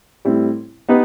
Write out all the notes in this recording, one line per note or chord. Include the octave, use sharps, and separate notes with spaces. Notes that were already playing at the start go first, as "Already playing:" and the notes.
A2 G3 C4 E4
B3 D#4 G4 B4